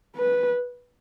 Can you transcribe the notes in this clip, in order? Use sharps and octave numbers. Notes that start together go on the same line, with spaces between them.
B4